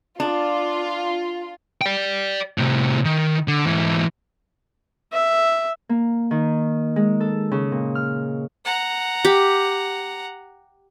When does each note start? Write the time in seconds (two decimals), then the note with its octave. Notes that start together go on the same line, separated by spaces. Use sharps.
0.20 D4 F4
1.82 D5 G5
2.58 A2 C3
3.05 D#3
3.48 D3
3.66 G#2 E3
5.13 E5
5.89 A#3
6.31 D#3
6.96 G#3
7.20 A4
7.51 C#3
7.72 A#2
7.95 F6
8.65 F#5 A#5
9.25 G4